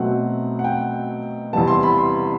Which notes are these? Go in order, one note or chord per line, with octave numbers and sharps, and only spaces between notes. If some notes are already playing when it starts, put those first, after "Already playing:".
Already playing: B2 F#3 A3 C4 F#5
F#5
G5
E2 C3 G3 B3 A5
C6
B5
C6